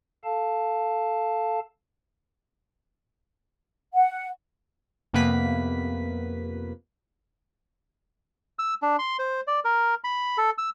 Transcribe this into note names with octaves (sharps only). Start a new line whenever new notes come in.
A4 F5 A5
F#5
F2 C3 A#3 B3 B4 B6
E6
D4
C6
C5
D5
A#4
B5
A4
E6